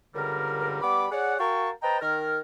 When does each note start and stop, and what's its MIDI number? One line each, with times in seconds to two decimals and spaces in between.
0.15 0.79 37
0.15 0.79 43
0.15 0.79 50
0.15 0.79 55
0.15 0.79 70
0.82 1.06 55
0.82 1.06 59
0.82 1.06 83
0.82 1.06 86
1.12 1.35 68
1.12 1.35 73
1.12 1.35 74
1.12 1.35 78
1.39 1.69 66
1.39 1.69 70
1.39 1.69 77
1.39 1.69 79
1.39 1.69 81
1.39 1.69 85
1.83 1.98 71
1.83 1.98 72
1.83 1.98 75
1.83 1.98 79
1.83 1.98 81
1.83 1.98 82
2.01 2.40 51
2.01 2.40 70
2.01 2.40 89